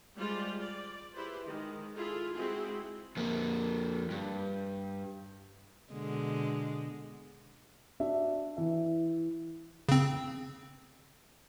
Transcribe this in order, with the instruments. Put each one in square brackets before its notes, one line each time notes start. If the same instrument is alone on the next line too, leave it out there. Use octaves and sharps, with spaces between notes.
[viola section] G3 G#3 F4 G4 C5 D5
D5
E4 G4 G#4 B4 C5
D#3 G#3
E4 F4 G#4 A4
G#3 C4 E4 F#4 G#4
[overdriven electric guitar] F2 A#3
G2
[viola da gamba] B2 D3 G#3
[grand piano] D4 F#4 E5
E3 E5
[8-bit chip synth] C#3 C4